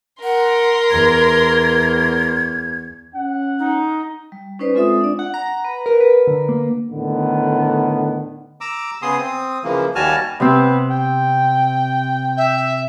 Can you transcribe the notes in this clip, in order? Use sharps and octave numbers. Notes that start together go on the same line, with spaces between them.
A#4 F#5 C6
E2 G#6
C#4 F#5
D#4
G3
C#4 D#4 B4 C5 D5
G#3 C4 F4 A4 E5 D#6
D4 D5
F#5
A#5
B4
A#4
B4
D3
A#3
A2 D3 D#3 B3
A#5 D6 E6
C#3 B3 G#4 C6 D#6
C4 D#6
C#3 E3 F3 A#3
D#2 G3 F#4 G#5 A5 F6
C3 B3 C4
G5
E5